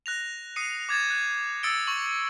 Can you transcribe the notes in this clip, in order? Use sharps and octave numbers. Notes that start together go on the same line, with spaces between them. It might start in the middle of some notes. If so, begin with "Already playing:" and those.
F#6 A#6 F7
D#6 C7 C#7 D#7
D6 G#6 A6 E7
F#6 G#6
D#6 E6 A6 C#7 D7 G7
C#6 F#7